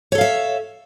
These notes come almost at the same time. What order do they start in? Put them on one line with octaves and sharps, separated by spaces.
C#5 A4 F5 E5